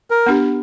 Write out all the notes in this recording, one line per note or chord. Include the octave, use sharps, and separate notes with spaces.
A#4
B3 D4 G4